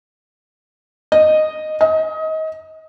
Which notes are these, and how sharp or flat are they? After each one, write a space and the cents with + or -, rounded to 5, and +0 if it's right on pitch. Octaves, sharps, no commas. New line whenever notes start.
D#5 -10
D#5 +25